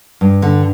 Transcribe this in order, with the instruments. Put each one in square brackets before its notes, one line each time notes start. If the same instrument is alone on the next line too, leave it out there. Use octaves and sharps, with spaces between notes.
[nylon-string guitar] G2
D3